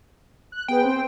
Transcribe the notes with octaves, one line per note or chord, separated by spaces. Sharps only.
F#6
B3 G#4 B4 G5
C4 C5